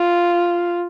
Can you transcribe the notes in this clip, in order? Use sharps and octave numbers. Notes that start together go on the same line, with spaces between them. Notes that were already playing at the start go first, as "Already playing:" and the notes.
Already playing: F4